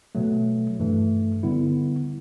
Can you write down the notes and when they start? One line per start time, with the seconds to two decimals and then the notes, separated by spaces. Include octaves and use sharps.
0.15 B2 F#3 A3
0.80 G2 E3 A3
1.43 D3 G3 B3 E4